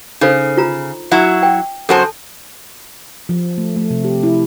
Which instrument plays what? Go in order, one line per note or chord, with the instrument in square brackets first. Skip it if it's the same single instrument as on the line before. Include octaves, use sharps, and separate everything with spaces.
[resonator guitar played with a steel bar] C#3 [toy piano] D#4 A4 C5
[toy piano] F4 A#5
[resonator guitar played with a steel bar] F#3 E4 F#4
[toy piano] G5
[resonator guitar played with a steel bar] F#2 F#4 C5 [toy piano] A4 G#5 A5
[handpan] F3
A3
A3
C3
G4
E4